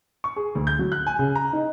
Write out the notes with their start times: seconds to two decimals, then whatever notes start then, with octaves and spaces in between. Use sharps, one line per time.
0.24 C#6
0.36 G#4
0.55 D2
0.67 G6
0.79 F#3
0.92 F#6
1.07 G#5
1.19 C#3
1.36 A#5
1.53 D#4